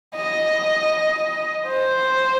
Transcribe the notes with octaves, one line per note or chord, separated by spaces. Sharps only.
D#5
C5